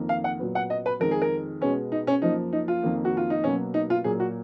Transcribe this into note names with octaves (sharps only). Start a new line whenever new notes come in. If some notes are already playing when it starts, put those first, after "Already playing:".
Already playing: F2 D#3 A#3
F5
F#5
A#2 F#3 B3
F#5
D#5
B4
F2 D#3 G#3 A#4
G#4
A#4
B2 G#3 B3 C#4
D#4
C#4
F#2 F3 A#3 D#4
D#4
F4
F2 D#3 A#3
F#4
F4
D#4
B2 F#3 A#3 C#4
D#4
F4
A#2 F#3 A#3 G#4
F#4